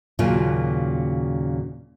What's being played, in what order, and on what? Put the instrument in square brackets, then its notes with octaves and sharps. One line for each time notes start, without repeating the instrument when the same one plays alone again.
[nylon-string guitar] D#2 A#2 C#3 F#3 F4